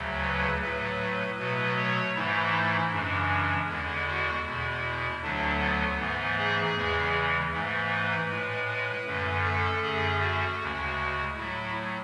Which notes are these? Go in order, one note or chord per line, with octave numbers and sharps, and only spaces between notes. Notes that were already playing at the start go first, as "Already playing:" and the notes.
Already playing: D2 C#3 F#3 A3
B4
A2 F#3 A3 B4
B2 F#3 A3 B4
C#5
G#2 E3 A3 E4
F#2 C#3 E3 G#3 D4
E2 D3 G#3 E4
F#4
E2 B2 G#3 E4
D2 D3 F#3 A3 D4
B3
G#2 E3 A3
G#4
E2 C#3 E3 G#3
G#2 E3 A3
B4
A2 G#3
B4
F#2 D3 A3
A4
F#2 D3 A3 G#4
F#4
D2 C#3 G#3
A2 F#3 A3 E4